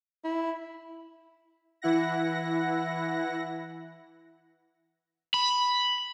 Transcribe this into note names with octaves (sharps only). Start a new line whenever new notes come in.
E4
E3 E4 F#5 A#6
B5